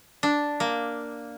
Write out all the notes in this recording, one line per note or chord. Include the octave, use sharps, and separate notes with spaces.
D4
A#3